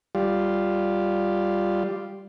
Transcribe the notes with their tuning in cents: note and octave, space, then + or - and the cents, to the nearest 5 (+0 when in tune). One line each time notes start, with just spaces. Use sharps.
G3 +0 F4 +0